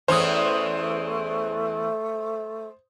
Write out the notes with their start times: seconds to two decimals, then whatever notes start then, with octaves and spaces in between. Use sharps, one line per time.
0.08 E2 E3 A3 C#4 C5 D#6